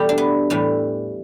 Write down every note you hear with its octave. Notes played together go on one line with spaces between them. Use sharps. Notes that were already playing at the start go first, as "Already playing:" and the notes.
Already playing: E2 B2 G3 A3 G4
D4
B3
A2 E3 G3